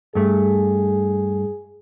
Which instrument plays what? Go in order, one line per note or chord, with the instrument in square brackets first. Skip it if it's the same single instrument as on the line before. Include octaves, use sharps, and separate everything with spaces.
[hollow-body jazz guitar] G2 A3 [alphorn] G#4